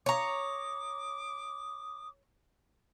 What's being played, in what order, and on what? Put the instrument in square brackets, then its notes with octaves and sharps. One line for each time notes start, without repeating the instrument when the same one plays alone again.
[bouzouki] C#5 A#5 [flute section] D6 D#6